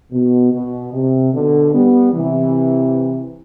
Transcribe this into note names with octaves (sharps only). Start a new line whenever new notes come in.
B2
B2
C3
B2 D3
G3 B3
C3 E3